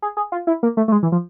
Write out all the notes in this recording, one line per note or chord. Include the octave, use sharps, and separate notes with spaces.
G#4
G#4
F4
E4
A#3
A3
A3
G#3
E3
F3